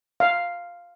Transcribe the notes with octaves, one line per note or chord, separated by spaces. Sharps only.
F5